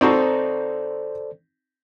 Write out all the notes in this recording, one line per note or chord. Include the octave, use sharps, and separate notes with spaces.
C4 D#4 F#4 A4 C5 D5